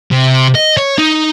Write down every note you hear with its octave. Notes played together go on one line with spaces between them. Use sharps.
C3
D#5
C#5
D#4